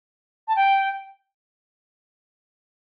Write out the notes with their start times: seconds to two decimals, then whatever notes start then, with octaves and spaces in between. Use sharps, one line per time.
0.48 A5
0.56 G5